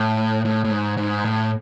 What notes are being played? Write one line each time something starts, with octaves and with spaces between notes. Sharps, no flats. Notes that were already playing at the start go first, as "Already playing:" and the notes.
Already playing: A2
A2
A2
G#2
G#2
A2